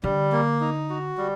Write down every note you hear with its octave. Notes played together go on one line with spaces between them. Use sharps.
D3 G3
A#3
D#4
F#4
G3